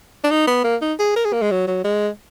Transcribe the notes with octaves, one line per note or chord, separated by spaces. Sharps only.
D4
D#4
B3
A#3
D#4
G#4
A#4
G#4
A#3
G#3
F#3
F#3
G#3